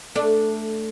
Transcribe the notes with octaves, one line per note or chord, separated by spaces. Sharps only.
A3 D4